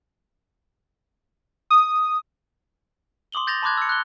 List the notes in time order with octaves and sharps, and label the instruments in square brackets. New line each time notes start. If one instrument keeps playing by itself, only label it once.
[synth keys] D#6
[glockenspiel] C6 D6 D#6 F#7 G7
G6 A6 A#6 F7
A5 B5 C6 D6 F#6 G#6
E6 C#7
F#6 G7